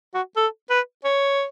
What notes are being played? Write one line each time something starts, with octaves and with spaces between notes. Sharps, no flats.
F#4
A4
B4
C#5